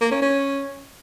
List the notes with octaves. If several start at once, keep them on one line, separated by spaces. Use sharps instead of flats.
A#3
C#4
C#4